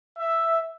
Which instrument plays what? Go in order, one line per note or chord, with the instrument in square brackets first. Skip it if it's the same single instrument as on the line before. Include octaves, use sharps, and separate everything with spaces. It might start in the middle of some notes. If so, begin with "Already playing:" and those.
[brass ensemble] E5